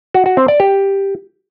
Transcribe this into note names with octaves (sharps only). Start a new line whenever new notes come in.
F#4
F#4
C4
D5
G4